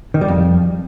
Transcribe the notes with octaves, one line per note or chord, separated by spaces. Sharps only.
D#3
G3
F2